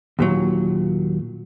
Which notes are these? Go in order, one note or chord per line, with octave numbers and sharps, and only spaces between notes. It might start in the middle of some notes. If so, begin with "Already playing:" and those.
D#2 A#2 F#3